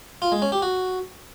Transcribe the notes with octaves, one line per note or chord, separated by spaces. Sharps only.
F4
G#3
C#4
G4
F#4